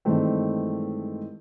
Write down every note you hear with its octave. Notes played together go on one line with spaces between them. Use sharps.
G2 D#3 E3 G#3 A3 C4